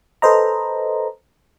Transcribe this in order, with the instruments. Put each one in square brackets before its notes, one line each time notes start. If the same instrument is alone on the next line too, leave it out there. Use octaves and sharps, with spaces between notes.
[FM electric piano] A4 B4 C5 D#5 A#5